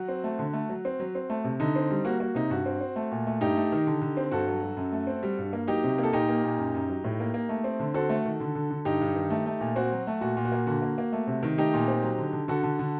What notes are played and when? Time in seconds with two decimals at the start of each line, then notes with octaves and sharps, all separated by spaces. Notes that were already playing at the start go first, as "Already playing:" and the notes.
Already playing: F#3 F#4
0.08 C4
0.24 A3
0.39 D3
0.53 A3
0.69 F#3
0.85 C4
1.00 F#3
1.15 C4
1.30 A3
1.44 C3
1.60 D3 D#4
1.76 C4
1.91 G3
2.05 A#3 F#4
2.20 A#3 F#4
2.35 C3 D#4
2.50 G2 F#4
2.66 C4
2.81 C4
2.96 A3
3.12 A#2
3.27 A3
3.41 G2 D#4 G4
3.57 A3
3.72 D#3
3.87 D3
4.02 D3
4.17 C4
4.31 G2 F#4 A4
4.48 F#3
4.62 F#3
4.77 F#2
4.92 A3
5.07 C4
5.23 G3
5.38 G2
5.53 A#3
5.68 F#3 D#4 G4
5.84 C3
5.98 A#3
6.03 A4
6.13 A#2 D#4 G4
6.29 A#3
6.44 A#2
6.58 F#2
6.75 F#2
6.90 F#3
7.04 A2
7.20 A#3
7.34 A#3
7.49 A3
7.64 C4
7.80 D3
7.94 C4 F#4 A4
8.10 A3
8.25 D#3
8.40 D3
8.55 D3
8.70 D3
8.85 G2 D#4 G4
9.01 G2
9.15 D#3
9.30 A3
9.46 A3
9.61 A#2
9.76 C4 F#4
9.92 F#3
10.07 A3
10.21 A#2 F#4
10.37 A#2
10.45 F#4
10.52 A#3
10.67 D3 F#4
10.82 A#3
10.98 A#3
11.13 A3
11.27 C3
11.43 D#3
11.58 A3 D#4 G4
11.74 A#2
11.88 C4
12.03 F#3
12.18 D3
12.33 D3
12.48 D3 F#4 A4
12.63 D3
12.79 D3